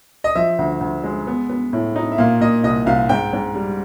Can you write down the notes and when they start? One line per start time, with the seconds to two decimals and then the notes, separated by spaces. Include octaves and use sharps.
0.24 D#5
0.35 F3 E5
0.59 D2
0.81 D2
1.04 G#3
1.27 B3
1.50 B3
1.73 A2
1.96 D#4
2.12 E5
2.18 A#2 F5
2.41 A#2 D#5
2.64 C2 D#5
2.86 C2 F5
3.09 G#2 G5
3.33 G#2
3.55 G3